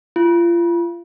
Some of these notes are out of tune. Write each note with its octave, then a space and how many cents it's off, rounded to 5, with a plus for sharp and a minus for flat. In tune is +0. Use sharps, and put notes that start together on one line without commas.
F4 -35